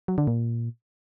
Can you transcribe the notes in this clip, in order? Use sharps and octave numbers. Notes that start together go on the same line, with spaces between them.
F#3
D3
A#2